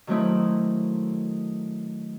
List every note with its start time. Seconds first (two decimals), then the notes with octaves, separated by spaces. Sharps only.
0.07 D#3 F#3 A3 C4 D#4 E4